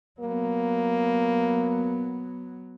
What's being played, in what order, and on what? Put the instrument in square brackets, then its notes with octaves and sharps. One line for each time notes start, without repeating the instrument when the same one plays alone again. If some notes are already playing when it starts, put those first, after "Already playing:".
[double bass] F#3 B3 [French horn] A#3